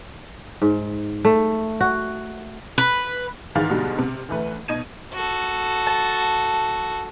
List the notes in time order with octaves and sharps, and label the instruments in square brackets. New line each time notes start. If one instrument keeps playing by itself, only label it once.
[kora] G#2
A3
F#4
[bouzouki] B4
[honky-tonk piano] G#2 D#3 E3 F5 F6 A6
G#2 B2 D3 G3 G#3 F#4
C3
D2 E3 A3 B4
B2 D#4 G#6 D#7
[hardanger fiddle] F#4 A4
[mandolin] A5